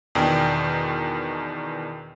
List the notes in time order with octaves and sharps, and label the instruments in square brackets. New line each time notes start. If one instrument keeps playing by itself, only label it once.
[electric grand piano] E2 B2 D#3 D4 G5